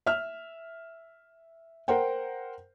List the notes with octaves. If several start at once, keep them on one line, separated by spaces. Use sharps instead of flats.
E5 F6
A#4 C5 F#5 G5